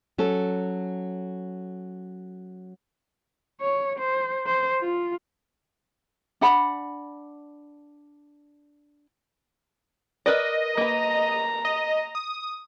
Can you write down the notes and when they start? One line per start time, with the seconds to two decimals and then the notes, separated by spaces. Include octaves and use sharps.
0.18 F#3 C#4 A4
3.61 C#5
3.99 C5
4.46 C5
4.81 F4
6.41 D4 F#5 B5
10.26 A#4 B4 D5 D#5
10.77 A#3 B4 A#5
11.65 D#5
12.15 D#6